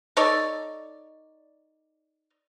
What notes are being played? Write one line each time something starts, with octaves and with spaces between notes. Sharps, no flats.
D#4 A4 C#5 D5